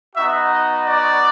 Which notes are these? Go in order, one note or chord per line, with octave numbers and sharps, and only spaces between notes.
B3 D#4 F#4 E5
D#5
D5